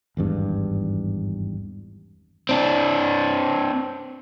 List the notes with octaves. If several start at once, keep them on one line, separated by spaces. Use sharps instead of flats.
G#1 E2 G2
C4 D4